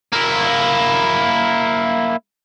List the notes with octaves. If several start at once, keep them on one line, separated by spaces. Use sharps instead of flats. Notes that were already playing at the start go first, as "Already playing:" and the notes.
A#3 E4